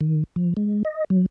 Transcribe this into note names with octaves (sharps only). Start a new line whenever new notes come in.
D#3
F3
G#3
D#5
F#3